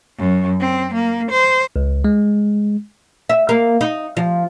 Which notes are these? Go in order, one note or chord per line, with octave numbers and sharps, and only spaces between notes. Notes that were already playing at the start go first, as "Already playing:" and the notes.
F#2
C4
A#3
C5
C#2
G#3
E5
A#3
D#4
F3